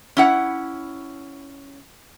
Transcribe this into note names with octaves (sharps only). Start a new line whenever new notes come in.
C#4 E4 F#5